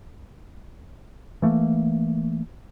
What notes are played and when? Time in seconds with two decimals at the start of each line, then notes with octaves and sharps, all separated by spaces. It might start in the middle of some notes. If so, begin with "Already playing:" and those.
1.42 E3 A3 A#3